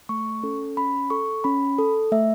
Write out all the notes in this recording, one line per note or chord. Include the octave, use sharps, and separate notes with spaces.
A3 C#6
C#4 A4
C#4 B5
A4 C#6
C#4 B5
A4
A3 E5